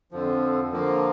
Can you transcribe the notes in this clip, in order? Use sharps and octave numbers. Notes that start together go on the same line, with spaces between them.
F2 D3 F3
D3 F3 A#3